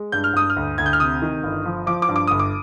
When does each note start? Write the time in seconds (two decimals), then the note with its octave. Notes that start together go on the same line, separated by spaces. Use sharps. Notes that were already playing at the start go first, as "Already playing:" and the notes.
Already playing: G#3
0.12 G2 G6
0.24 F6
0.33 G2 D#6
0.50 F6
0.56 D2
0.78 D2 G#6
0.86 G6
0.93 F6
0.99 C3 D#6
1.22 D#3
1.43 G1
1.65 F3
1.87 F3 D6
2.02 D6
2.09 G2
2.16 D6
2.27 G1 D#6
2.39 D6